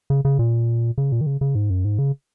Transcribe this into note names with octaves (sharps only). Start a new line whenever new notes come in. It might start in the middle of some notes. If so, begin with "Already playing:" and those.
C#3
C#3
A#2
C#3
A#2
D#3
C#3
C#3
G#2
F#2
G#2
C#3